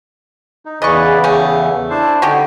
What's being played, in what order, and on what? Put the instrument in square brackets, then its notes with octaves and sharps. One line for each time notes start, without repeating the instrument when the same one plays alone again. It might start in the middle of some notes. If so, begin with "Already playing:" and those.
[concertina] D#4
[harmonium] E2 C#3 E3 [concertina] G#4 B4 D5 [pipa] D#5 C#6
[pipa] G3 A3 C#4 [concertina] G#4
[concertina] D4 C5 [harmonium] E4 A5
[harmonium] D3 [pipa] C#4 F#4 G4 [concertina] D#4